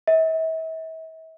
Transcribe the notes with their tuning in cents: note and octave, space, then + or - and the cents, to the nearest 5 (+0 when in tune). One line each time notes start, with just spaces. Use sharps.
E5 -40